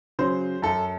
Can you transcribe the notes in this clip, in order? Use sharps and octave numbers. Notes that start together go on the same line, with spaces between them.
C#3 F#3 C5
F#2 A4